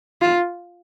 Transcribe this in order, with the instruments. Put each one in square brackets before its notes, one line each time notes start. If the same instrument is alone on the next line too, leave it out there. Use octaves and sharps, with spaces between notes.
[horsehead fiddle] F4